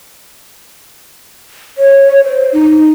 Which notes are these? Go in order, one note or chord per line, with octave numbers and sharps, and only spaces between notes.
C#5
C5
D#4